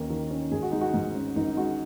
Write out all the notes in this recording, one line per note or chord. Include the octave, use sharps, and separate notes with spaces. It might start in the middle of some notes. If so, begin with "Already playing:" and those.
Already playing: D#2 D#3 A#3 C#4
D#3
C#4
G#1 G#4
F#4
G#3 D#4
F#4
G#2
C#4
G#1 D#4
G#3 F#4